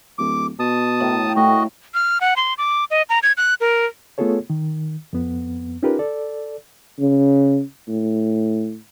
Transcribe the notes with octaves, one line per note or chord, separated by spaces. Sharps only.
D1 D6
B2 A5 D#6
A2 A#4
F5 G5
A2 F#4 D#5
F6
F#5
C6
D6
D#5
A#5
G#6
F#6
A#4
A3 B3 F4 G#4 A4 C#5
D#3
F2 B3
C#4 D#4 F4 G4 A#4 B4
A4 D5
C#3
A2